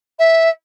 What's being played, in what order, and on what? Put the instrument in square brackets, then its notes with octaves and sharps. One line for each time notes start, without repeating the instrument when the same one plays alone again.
[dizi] E5